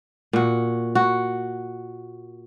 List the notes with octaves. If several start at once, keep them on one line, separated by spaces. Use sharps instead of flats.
A#2 F#4
F#4